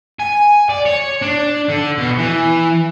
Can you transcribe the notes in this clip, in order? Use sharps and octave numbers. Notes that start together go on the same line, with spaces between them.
G#5
D5
C#5
D4
D3
B2
E3